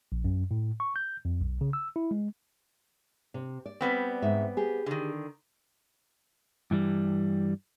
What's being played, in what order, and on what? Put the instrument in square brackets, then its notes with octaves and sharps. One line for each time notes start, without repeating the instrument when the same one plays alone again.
[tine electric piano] A#1
F#2
A2
C#6
G6
F2
B1
C#3
E6
E4
G#3
[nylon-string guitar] C3
D5
[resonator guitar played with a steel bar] G3 B3 C4
[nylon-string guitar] G#2 D#4 E5
G4 G#4
[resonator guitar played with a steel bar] D3 D#3
[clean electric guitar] G2 E3 G3